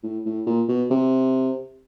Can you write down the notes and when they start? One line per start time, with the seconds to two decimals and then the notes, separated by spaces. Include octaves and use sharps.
0.03 A2
0.26 A2
0.47 A#2
0.68 B2
0.90 C3